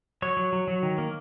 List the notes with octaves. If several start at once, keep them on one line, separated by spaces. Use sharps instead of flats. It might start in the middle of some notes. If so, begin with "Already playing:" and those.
F#3 C#5
F#3
F#3
F#3
D#3
A#3